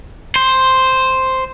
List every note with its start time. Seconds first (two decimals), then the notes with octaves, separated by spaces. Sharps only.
0.36 C5